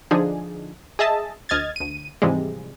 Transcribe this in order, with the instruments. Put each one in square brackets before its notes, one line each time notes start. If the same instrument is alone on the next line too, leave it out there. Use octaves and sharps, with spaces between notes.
[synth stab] D3 F3 D4 D#4 G#4
G#4 D#5 E5 A5
D2 D#5 F6 G#6 A6
D2 D#7
G#2 C3 E3 F3 G3 G#3